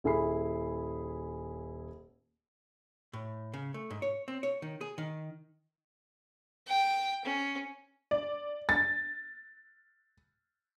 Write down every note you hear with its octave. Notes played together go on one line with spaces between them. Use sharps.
D#1 E4 G#4 B5 C7
A2
C#3
A3
G#2
C#5
C4
C#5
D#3
G#4
D#3
G5
C#4
D5
A6